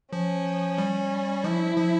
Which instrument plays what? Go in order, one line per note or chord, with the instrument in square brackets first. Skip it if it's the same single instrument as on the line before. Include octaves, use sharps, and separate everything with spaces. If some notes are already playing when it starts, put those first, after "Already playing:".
[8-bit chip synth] F3 [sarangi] C#4
[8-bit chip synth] G3
[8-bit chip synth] F3 [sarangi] E4
[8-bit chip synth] F3